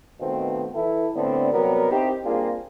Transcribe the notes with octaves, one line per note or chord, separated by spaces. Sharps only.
B2 D#3 F3 A3 B3 C4
E3 E4 A4
A2 D3 A3 B3 C4 D4
C3 F#3 G3 B3 A#4
C4 D#4 E4 G4
G3 A#3 C4 D4 F4 G#4